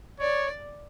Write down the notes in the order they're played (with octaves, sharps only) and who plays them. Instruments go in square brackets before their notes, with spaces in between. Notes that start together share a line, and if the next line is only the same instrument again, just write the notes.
[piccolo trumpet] C#5 [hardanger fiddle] D5